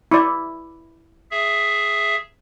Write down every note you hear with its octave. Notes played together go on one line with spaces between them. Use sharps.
E4 D5
G#4 E5